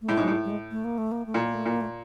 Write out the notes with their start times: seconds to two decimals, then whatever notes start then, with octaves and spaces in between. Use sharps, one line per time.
0.02 A3
0.08 A2 G#3
0.17 G#2 F#3
0.27 A2 G3
0.45 G3
0.50 G#3
0.71 A3
0.84 A#3
0.98 A3
1.12 A#3
1.26 A3
1.34 A#2
1.39 A#3
1.54 A3
1.66 A#2 A#3
1.81 A3